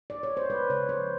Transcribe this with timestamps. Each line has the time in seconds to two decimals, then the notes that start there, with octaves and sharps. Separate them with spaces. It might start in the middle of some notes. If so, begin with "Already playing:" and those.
0.10 D5
0.23 C#5
0.37 C5
0.50 G#3 B4
0.70 C#3 C#5
0.89 F3 C5